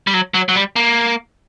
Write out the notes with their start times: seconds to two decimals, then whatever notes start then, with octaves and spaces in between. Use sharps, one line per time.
0.07 G3
0.14 F#3
0.34 F#3
0.49 F#3
0.56 G3
0.76 A#3